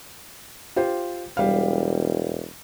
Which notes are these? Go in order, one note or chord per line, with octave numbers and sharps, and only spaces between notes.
F4 G4 C5
E1 G3 F5